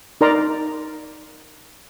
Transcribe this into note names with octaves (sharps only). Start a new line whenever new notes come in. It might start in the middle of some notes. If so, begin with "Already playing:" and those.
D#4 A#4 D5 A#5 C6